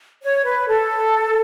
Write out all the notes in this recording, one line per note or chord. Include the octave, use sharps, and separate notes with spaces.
C#5
B4
A4